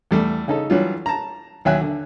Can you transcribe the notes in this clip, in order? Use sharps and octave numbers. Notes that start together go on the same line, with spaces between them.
E2 G3 A3
C#3 D#4 A4
E3 F#3 G3 F4
A5 A#5
D#2 F#3 E5 G5 G#5 F#6
D3